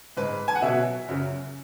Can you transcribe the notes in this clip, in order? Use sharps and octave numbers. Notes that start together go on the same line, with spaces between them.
G#2 G#3 B4
G#5
F#5
B2 E5
F#3
F#2 C#3 F#3